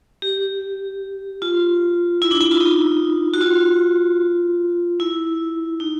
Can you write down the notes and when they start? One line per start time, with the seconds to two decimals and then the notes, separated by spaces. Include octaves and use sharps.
0.22 G4
1.42 F4
2.22 E4
2.31 D4
2.41 E4
2.51 F4
2.60 D#4
3.34 F#4
3.41 F4
5.00 E4
5.80 D#4